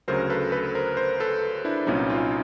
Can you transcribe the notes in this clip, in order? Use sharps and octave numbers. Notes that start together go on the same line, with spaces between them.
D2 C#3 F#3 A#4 C5
A4 B4
A4 B4
A#4 C5
A#4 C5
A4 B4
D4 E4
C2 A#2 F#3 C#4 D#4
D#4 F4